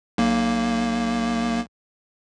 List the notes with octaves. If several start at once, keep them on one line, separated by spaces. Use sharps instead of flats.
B1 A#3